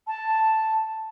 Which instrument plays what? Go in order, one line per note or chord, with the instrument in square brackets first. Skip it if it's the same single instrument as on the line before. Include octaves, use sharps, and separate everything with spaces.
[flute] A5